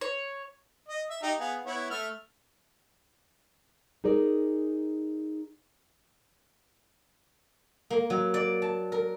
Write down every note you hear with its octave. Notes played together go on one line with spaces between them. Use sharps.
C#5
D#5
E5
D#4 G4
B3 G#4 F5
B3 E4 C#5
A3 E5 F6
D#4 G#4 A#4 D5
A#3
F#3
D5
A5
A#4